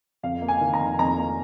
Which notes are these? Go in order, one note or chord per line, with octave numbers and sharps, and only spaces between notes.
F2 F5
A#3
G#5
D#3
A#5
F1
F2 A#5
A#3